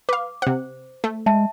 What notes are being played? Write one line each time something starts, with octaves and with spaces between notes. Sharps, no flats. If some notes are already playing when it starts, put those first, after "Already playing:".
B4 F5 D6
C3 C5 F#5
A3
G#3 E5 A5